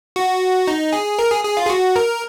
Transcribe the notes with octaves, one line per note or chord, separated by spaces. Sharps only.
F#4
D#4
G#4
A#4
G#4
G#4
F4
G#4
F#4
A#4